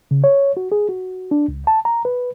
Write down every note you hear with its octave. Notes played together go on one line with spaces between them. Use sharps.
C#3
C#5
F#4
G#4
F#4
D4
C#2
A5
A#5
B4